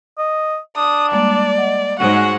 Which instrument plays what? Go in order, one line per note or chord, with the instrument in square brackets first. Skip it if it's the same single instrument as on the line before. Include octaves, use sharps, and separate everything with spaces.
[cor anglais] D#5
[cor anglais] D4 [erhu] D#6
[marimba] G3 G#3 A#3 [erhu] D5
[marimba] D#5 F#5
[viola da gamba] G#2 G#3 [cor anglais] F#4 [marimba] C5 C#5 [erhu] F#5